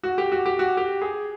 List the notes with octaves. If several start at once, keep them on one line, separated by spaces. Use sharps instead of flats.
F#4
G4
F#4
G4
F#4
G4
G#4